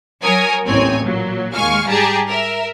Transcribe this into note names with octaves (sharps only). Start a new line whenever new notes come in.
F#3 A#4 C#5 G#5 D#6
A1 D#2 C4 C#5 G#5
A#2 F#3
D#2 G#3 F5 G#5 C#6 F6
G#2 G3 G4 G#4 A5 A#5
A#4 E5